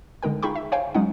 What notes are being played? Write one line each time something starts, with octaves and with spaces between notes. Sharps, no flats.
D3 G#3 D#4 A#4 G5
D#4 F4 G#4 G5 B5 C#6
E5
C5 C#5 F5 G5 G#5
F#3 G#3 C#4 D#4 F#5